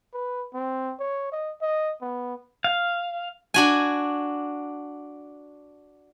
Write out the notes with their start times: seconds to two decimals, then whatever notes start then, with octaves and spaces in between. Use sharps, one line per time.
0.14 B4
0.54 C4
1.00 C#5
1.32 D#5
1.62 D#5
2.02 B3
2.64 F5
3.54 D4 F#4 G#5